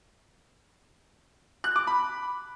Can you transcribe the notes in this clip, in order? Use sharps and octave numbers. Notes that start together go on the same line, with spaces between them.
F#6
D6
B5